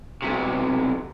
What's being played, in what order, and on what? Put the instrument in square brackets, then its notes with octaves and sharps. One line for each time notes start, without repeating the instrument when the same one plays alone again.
[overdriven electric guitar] B1 C3